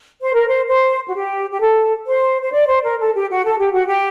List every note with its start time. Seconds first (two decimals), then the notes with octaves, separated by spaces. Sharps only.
0.22 C5
0.34 A#4
0.48 C5
0.68 C5
1.08 F#4
1.14 G4
1.51 G4
1.60 A4
2.07 C5
2.41 C5
2.53 D5
2.68 C5
2.84 A#4
2.99 A4
3.15 G4
3.30 F#4
3.45 A4
3.59 G4
3.72 F#4
3.85 G4